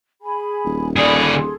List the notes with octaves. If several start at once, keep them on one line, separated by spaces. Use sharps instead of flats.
G#4 G#5 B5
D#1
D3 G#4 D5 B5
G#4 A4 C6